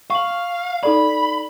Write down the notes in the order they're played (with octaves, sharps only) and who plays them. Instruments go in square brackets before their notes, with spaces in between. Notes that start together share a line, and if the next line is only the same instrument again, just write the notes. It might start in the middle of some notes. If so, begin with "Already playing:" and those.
[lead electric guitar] F5 [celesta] C#6 F#7
[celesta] D#4 A4 D5 [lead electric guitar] B5